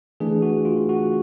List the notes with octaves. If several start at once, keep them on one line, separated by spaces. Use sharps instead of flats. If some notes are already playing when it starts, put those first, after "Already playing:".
E3 A3 D4 G#4
F#4
F4
F#4